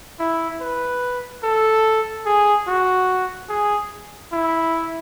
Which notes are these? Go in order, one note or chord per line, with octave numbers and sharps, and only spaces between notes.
E4
B4
A4
G#4
F#4
G#4
E4